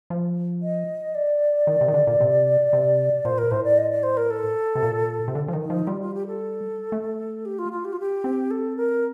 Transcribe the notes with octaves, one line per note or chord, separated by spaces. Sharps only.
F3
D#5
D5
D#3
C3
D#3
D3
A#2
C3
C3
A#2 C5
A#4
A2 C5
D5
D#5
D5
C5
A#4
A4
C3
A#2
C3
D3
F3
D#3
D#4
F3
G3 F4
F4
G4
A4
A3
G4
F4
F4
G4
F4
G4
C4
A4
A#4